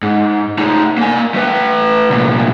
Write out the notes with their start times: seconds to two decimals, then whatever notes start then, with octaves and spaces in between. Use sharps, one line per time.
0.02 G#2
0.58 A3 D#4
0.97 A#3 G#5
1.34 A3 B4
2.10 C2 A#2